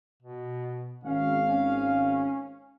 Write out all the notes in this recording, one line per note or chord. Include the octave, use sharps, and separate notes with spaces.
B2
G#1 C#4 F5
C#4